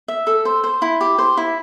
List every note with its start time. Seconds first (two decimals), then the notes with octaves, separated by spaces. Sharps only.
0.08 E5
0.27 A4
0.45 C5
0.64 C5
0.82 E4
1.01 G4
1.18 C5
1.37 E4